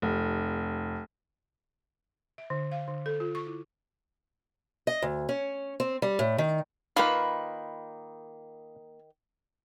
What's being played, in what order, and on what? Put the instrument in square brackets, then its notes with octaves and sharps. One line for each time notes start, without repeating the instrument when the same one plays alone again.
[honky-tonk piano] F1
[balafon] E5
D3
F5
D3
A4
F4
C#6
E4
[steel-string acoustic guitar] D#5
D2
C#4
C4
G3
A2
D#3
[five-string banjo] D#3 B4 [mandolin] A#3 B5 F6 [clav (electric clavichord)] F4